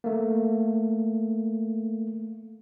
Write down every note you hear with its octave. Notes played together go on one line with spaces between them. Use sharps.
A3 A#3